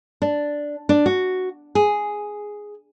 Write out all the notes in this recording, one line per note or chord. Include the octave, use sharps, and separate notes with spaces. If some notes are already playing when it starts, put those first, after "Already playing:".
D4
D4
F#4
G#4